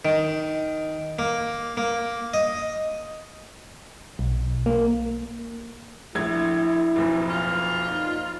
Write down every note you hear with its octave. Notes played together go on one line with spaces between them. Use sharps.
D#3
A#3
A#3
D#5
B1
A#3
A#1 A3 E4 G#6
F#1 B1 F2
F4
A#2 F3 D#4